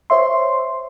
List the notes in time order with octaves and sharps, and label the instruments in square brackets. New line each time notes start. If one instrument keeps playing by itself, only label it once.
[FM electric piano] C5 C#5 E5 C6